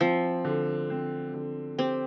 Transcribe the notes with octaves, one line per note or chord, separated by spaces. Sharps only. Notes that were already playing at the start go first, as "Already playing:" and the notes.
F3 C4
D3
C4
D3
C4 G4